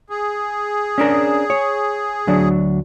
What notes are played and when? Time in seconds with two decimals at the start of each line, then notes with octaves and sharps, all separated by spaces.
0.10 G#4
0.98 C#4 D4 A#4
1.50 C#5
2.27 D2 F#3 D4